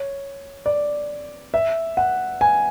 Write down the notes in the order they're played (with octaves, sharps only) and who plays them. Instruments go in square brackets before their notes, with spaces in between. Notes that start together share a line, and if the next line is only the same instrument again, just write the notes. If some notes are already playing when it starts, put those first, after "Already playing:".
Already playing: [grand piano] C#5
D5
E5
F#5
G#5